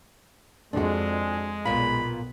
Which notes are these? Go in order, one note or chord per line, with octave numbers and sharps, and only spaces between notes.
F2 G#3 D4 F#4
B1 A#2 B3 F5 B5